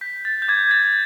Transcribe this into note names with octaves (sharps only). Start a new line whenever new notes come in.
G6 B6
G6 A6
G6
D6 G#6
G6 A6